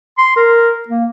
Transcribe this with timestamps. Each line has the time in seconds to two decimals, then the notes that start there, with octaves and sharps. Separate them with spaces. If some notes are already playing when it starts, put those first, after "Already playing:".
0.18 C6
0.36 A#4
0.89 A#3